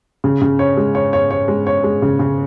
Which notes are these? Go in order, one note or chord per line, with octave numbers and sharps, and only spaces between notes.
C#3
C#3
C#5
G#3
C#5
C#5
C#5
G#3
C#5
G#3
C#3
C#3